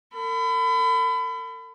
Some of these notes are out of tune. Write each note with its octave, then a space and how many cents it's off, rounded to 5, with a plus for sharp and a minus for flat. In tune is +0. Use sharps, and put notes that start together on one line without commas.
A#4 -45 B5 +30